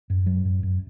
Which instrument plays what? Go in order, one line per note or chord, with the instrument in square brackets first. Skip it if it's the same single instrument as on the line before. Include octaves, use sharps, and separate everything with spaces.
[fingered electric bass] F#2
F#3
F#2
F#2